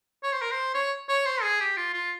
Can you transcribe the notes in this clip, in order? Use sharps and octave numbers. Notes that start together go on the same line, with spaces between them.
C#5
C5
A#4
C5
C#5
C#5
C5
G#4
G4
F4
F4